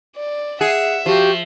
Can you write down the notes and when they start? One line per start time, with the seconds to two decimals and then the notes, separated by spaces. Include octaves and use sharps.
0.16 D5
0.61 G#4 E5 F#5
1.06 F3 F#4 G4